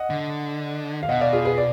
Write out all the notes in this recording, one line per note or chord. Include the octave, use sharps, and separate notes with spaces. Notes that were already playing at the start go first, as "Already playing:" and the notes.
Already playing: D#5 F#5
D3
F5
B2 D#5 F#5
D5 F5
F4 G#4
G#4 B4
D5